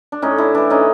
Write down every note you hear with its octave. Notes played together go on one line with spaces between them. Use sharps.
D4
A2 C#4 D#4
D4 E4
E3 A3 D4 E4
C#4 D#4